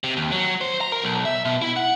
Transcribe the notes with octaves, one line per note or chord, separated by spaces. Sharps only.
C3
D#2
F#3
C5
A#5
A#4
B1
E5
B2
E4
F#5